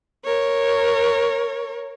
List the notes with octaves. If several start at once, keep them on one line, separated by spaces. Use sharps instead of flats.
A#4 C#5